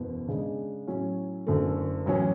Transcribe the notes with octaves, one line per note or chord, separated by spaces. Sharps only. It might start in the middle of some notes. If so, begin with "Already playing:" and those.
Already playing: F#1 E2 B2
C#3 G#3 D4 G#4
A2 F#3 C#4
F#1 F#2 D3 A3
A1 A2 F#3 C#4